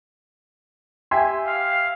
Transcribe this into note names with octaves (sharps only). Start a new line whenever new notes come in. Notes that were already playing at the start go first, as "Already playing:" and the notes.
G4 E5 G#5 C6
F5